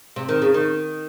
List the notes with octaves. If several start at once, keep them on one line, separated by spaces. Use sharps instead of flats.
C3
D#3
C#3
D#3